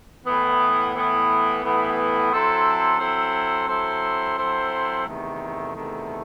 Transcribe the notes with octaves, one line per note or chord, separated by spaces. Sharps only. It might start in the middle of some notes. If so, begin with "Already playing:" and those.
A2 E3 B3
A2 E3 B3
A2 E3 B3
F#3 C4 E4 A4 C5
F#3 C4 E4 A4 C5
F#3 C4 E4 A4 C5
F#3 C4 E4 A4 C5
E2 C3 D#3 A3
E2 C3 D#3 A3